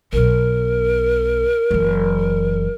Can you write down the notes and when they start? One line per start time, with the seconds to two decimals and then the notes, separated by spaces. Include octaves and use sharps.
0.13 B1 B2 A#4
1.71 F#1 E3